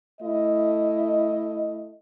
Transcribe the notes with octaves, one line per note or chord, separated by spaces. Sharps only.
A3 E4 D#5